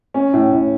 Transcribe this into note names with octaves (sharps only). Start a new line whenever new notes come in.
C#4
A2
A2